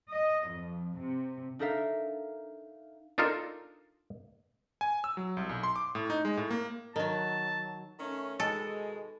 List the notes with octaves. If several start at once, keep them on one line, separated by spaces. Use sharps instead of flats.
D#5
F2
C3
D4 D#4 A4 A#4 E5 F5
D4 D#4 F4 A4 A#4
G#5
E6
F#3
C2
B1
C6
D6
A2
D#4
G#3
A2
A#3
D#3 F#3 A5
D#3 A3 C#4
B2 D#3 G#3 A4